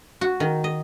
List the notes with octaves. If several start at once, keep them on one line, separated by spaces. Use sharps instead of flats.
F#4
D#3
D#5